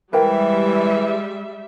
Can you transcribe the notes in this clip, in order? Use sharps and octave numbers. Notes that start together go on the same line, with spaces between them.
E3 G3 G#3 A#4 C5 E5 G5